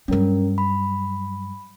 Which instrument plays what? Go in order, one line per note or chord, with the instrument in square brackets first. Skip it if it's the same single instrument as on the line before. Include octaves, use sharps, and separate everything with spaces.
[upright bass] G2 F#3 [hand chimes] C#4 A#4
[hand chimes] B5